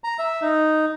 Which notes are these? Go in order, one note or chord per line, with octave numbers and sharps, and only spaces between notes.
A#5
E5
D#4